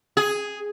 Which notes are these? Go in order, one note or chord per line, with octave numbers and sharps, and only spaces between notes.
G#4